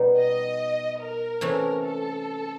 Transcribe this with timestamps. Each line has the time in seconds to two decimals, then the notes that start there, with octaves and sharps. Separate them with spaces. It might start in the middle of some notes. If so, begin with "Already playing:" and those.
Already playing: B2 G3 B3 D#4
0.18 D#5
1.00 A#4
1.41 C3 E3 A3 C#4
1.82 A4